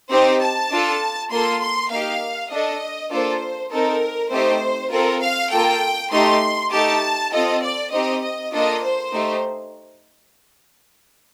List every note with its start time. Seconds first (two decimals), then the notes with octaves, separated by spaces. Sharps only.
0.10 C4 D#4 G4 C5
0.41 A5
0.71 D4 F4 A4
1.31 A#3 F4 A4 C6
1.61 C6
1.90 A#3 D#4 G4 F5
2.51 D4 A4 D#5
3.11 A#3 D4 F4 A4 C5
3.71 C4 D#4 A4 A#4
4.31 A3 C4 D#4 G4 C5
4.92 C4 F4 A4 A#4
5.22 F5
5.52 A#3 F4 A4 G5
6.12 A3 D#4 G4 C6
6.72 A3 D#4 G4 A5
7.32 C4 F4 A4 D#5
7.63 D5
7.92 C4 D#4 G4 D#5
8.23 D#5
8.53 A#3 D4 F4 A4 D#5
8.83 C5
9.12 A3 D#4 G4